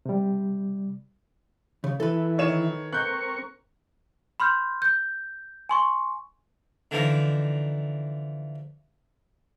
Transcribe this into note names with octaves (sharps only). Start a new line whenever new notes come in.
C3 G3
C#3
E3 E4 A4 B4
D#3 C#5 E7
C4 A#4 C#6 F#6 G6
B5 C6 F6 G6
G6
G#5 C6 C#6
D3 E3 F3 D#4